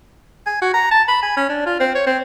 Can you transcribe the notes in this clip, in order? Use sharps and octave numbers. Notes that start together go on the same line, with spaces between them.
G#5
F#4
A#5
A5
B5
G#5
C#4
D4
F4
C4
C#5
C4